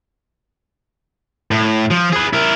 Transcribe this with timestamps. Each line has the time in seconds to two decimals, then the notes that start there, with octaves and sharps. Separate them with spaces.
1.51 A2
1.91 F3
2.13 G#4 B4
2.33 E4 A#4